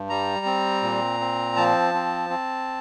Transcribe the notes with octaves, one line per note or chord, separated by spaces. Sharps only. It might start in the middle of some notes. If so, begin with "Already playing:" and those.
Already playing: G2
G3 A#5
C4
A#2
C4
F3 A5
C4
C4